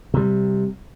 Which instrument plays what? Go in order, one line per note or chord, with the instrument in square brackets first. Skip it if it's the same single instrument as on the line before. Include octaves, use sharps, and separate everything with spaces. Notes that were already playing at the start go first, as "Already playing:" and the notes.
[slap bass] C3 G3